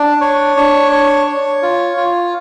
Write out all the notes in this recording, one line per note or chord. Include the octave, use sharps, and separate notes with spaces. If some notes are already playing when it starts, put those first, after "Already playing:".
Already playing: D4
C#5
D4
C#5
C#5
F4
F4